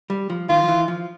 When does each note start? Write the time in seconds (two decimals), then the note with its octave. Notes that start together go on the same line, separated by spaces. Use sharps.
0.10 G3
0.30 F3
0.49 D#3 F4
0.63 F3
0.68 E3
0.88 F3